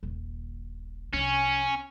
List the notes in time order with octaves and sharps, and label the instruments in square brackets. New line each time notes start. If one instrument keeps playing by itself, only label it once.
[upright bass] D#1 A#1
[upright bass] C2 F3 [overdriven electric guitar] C#4